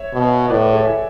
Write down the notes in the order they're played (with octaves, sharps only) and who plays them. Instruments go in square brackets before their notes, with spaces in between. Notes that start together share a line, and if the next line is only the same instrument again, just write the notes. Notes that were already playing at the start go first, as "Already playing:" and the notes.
Already playing: [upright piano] C#5 E5
[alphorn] B2
[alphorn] A2 [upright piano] B4 D5
[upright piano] B4 D5
A4 C#5
E5 G#5